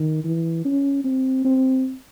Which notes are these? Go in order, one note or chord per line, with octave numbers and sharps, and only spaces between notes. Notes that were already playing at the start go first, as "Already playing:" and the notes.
Already playing: D#3
E3
C#4
C4
C4